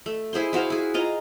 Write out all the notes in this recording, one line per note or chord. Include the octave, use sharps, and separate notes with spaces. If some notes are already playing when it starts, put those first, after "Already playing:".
A3
E4 G#4 C5 C6
E4 F#4 C5 F5
E4 G#4
F4 D#5 A#5